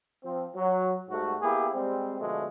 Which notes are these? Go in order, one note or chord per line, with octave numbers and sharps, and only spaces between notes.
F3 C4
F#3
G#2 G3 A3 F#4
A#3 B3 E4 G4 G#4
G3 G#3 C4
B2 D3 F3 G#3 A3